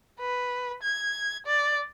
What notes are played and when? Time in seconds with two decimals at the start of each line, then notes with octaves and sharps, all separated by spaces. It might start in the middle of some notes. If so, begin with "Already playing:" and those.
0.20 B4
0.83 G#6
1.47 D5